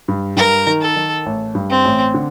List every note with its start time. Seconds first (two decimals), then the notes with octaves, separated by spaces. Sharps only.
0.08 G2
0.37 G2 A#4
0.67 D#3
0.81 A4
0.96 D#3
1.26 A1
1.55 G2
1.70 C4
1.85 A1
2.14 D3